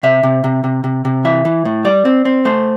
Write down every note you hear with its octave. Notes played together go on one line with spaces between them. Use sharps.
C3 E5
C3
C3
C3
C3
C3
E3 E5
E3
A2
G3 D5
C4
C4
A3 C5